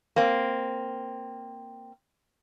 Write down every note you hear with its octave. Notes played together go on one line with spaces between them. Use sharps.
A#3 C4